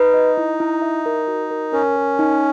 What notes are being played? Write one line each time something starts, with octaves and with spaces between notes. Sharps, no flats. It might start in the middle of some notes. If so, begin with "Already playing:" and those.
Already playing: D#4 B4
D#5
E4
E4
E5
A#4
F#4
A#4
C#4 A#4
A#4
D#4